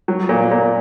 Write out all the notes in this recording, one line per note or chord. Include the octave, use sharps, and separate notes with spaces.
F#3
A#2
A#2